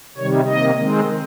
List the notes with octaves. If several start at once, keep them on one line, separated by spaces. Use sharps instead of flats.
C3 D#3 G3 C#5
C3 D#3 A#3 D#5
D#3 G#3 C4